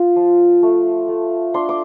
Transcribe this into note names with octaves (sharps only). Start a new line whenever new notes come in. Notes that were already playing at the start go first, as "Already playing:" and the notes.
Already playing: F4
F3
A3
A3
D4 C6
D6